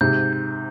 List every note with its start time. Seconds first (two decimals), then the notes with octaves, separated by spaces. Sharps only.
0.01 G#2 C3 G6
0.33 G6